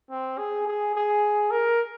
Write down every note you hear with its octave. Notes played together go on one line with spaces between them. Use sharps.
C4
G#4
G#4
G#4
A#4